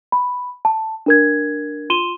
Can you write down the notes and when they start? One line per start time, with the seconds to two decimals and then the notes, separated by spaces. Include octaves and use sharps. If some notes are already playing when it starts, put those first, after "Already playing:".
0.12 B5
0.65 A5
1.06 D4 A#4 G#6
1.90 F4 C6 D#7 E7 G7